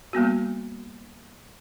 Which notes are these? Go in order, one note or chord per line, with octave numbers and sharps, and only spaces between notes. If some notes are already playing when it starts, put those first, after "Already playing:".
G3 A#3 B3 F#4